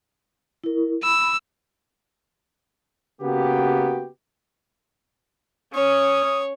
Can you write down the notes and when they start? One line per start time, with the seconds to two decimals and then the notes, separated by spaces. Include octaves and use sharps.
0.64 E4 A#4
1.03 B5 E6
3.21 C#3 A#3 B3 F#4 G4
5.74 C#4 C#5 D#6